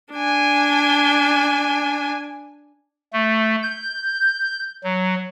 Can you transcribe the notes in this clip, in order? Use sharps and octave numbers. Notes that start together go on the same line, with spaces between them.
D4 G#5
A3
G6
F#3